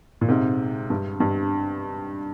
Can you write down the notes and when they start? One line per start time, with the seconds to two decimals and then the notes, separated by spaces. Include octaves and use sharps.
0.21 A#2
0.28 G#2 C3
0.90 G2
1.20 G2